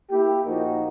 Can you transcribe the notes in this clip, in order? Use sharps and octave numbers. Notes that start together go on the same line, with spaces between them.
A#3 E4 G4
A#2 F3 D#4 F#4 A#4